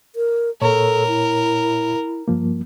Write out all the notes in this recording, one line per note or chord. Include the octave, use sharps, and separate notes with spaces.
A#4
A#2 A4 A#4 C#5
E4
G2 F3 A#3